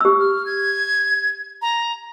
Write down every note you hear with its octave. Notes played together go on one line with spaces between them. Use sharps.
G4 E6
F6
G#6
A#5